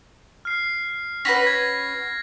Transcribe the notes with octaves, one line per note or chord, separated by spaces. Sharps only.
F6 C7
C#4 F#4 B4 A#6
G#6